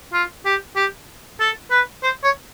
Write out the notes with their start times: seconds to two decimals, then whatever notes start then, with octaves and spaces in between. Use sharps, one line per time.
0.13 F4
0.45 G4
0.76 G4
1.40 A4
1.71 B4
2.03 C5
2.23 C#5